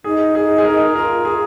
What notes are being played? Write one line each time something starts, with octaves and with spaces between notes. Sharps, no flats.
D#4 G#4
G#4
G#4
A#4
F4 A#4
G#4